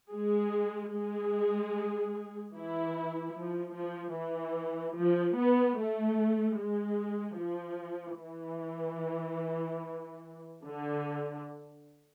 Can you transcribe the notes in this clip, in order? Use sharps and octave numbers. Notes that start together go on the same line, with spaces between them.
G#3 G#4
G#3 G#4
E3 E4
F3
F3
E3
F3
B3
A3
G#3
F3
E3
D3